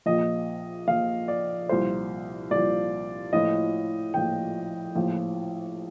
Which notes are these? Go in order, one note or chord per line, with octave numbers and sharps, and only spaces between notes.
A#1 A#2 F3 D#5
A#1 A#2 F3 F5
D5
C2 A#2 F3 C5
C2 A#2 F3 D5
A#1 A2 F3 D#5
A#1 A2 F3 G5
A#1 A2 F3